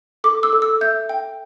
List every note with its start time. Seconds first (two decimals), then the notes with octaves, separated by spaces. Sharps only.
0.24 A4 D6
0.43 E6
0.53 A4
0.62 E6
0.81 E5 G6
1.09 G5